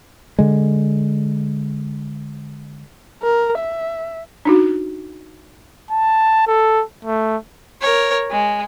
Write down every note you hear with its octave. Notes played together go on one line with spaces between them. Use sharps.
D3 G#3
A#4
E5
D4 D#4 F#4
A5
A4
A3
A#4 C#5
G#3